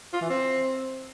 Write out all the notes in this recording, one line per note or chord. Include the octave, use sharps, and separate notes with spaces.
F4
E3
C4